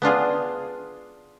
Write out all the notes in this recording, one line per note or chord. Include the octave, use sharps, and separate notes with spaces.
B3 D4 F4 G#4